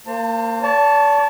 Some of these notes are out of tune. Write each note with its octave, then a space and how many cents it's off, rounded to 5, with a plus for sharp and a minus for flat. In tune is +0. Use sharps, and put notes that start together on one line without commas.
A#3 -25 C5 +5 A5 +35
D5 -40 A5 +0 C#6 -5